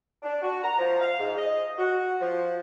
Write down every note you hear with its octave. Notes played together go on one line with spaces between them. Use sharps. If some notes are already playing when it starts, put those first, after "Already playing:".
D4
F#4
A#5
F3
F5
G#2
D#5
F#4
F3